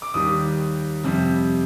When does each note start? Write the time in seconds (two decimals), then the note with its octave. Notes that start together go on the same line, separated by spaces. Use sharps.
0.02 D6
0.14 D#2 D#3 G3 D#6
1.04 F2 C3 G3